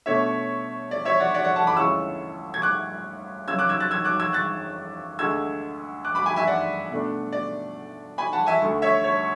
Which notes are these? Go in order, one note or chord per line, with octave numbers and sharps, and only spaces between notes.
B2 A3 D4 C#5 E5
D5
C#5 E5
D5 F#5
D5 F#5
D5 F#5
F#5 A5
B5 D6
D2 C#3 E3 G#3 C#4 C#6 E6
G#6
D6 F#6
C#3 F#3 C#4 E6 G#6
D6 F#6
E6 G#6
F#6 A6
E6 G#6
D6 F#6
E6 G#6
F#6 A6
D2 D3 G#3 E6 G#6
D6 F#6
B5 D6
G#5 B5
E5 G#5
D5 F#5
B2 A3 D4
D5
G#5 B5
F#5 A5
E5 G#5
D2 D3 A3
C#5 E5
C#5